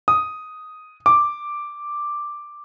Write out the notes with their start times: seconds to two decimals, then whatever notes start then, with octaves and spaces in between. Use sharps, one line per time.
0.08 D#6
1.06 D6